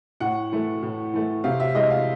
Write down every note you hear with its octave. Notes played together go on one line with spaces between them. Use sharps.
A2 F#5
E3 A3
A2
E3 A3
C3 F5
E5
E3 G#3 D#5
F5